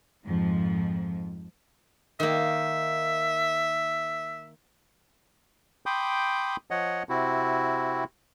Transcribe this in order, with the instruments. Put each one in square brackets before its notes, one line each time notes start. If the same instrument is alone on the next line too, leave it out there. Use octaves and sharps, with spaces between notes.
[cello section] F2 G#2 F3
[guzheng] D#3 A#3 [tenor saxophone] E5
[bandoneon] G5 B5 C6 D6 D#6 G6
F3 C#5 D#5 F#5
C3 C4 E4 F#4